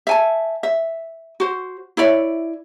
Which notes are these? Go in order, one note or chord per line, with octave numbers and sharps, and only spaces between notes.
E5 G#5 A5
E5
F#4 C5
E4 C#5 D5 E5